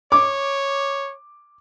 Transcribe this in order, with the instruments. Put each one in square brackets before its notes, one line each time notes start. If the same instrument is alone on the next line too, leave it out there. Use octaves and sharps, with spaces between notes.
[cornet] C#5 [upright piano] D6